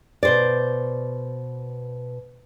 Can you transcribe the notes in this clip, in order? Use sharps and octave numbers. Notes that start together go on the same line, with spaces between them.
B2 C5 D5